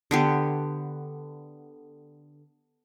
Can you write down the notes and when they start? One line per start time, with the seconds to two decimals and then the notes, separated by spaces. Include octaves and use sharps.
0.11 D3 B3 G4